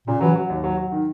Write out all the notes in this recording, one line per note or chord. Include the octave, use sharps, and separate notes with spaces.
A#2 C#3
E3 F#3
F#3
D#2
F#3
F#3
D#3